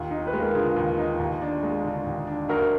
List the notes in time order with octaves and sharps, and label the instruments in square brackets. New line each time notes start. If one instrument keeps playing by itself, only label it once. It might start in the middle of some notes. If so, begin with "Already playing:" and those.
Already playing: [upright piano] D#2 [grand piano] F4
[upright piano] D#4
[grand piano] B4
[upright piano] G#3
[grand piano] A#4
[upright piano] D3 [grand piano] F4 G#4
[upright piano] D#2
D#4
D#2
D4
G#3
D3
D#2
D4
[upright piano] D2 [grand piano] F#4 A#4